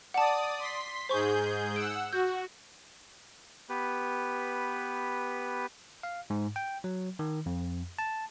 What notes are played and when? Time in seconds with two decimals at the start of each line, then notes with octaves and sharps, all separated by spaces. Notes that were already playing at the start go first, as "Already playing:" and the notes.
0.14 D5 F#5 A5 D#6
0.60 C6 B6
1.09 G#2 G#4 C5 C#6 G6
1.76 F#5 E6 D7
2.13 F#4 G6
3.69 B3 G4 B4
6.03 F5
6.30 G#2
6.56 G5
6.84 F#3
7.19 D#3
7.46 F2
7.99 A5